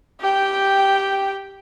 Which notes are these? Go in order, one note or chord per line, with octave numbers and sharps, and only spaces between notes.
G4 G5